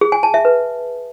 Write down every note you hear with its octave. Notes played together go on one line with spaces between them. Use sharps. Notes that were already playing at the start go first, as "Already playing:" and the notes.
G#4
G#5
A5
E5
B4